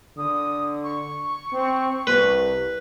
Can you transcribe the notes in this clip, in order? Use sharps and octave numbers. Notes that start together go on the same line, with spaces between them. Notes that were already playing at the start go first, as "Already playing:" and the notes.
D3 D#6
C#6
C4
C2 B4